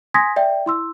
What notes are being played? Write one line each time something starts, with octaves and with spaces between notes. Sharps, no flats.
G#5 C6 D#6 G#6 A#6 B6
D5 E5 G5
E4 C6 E6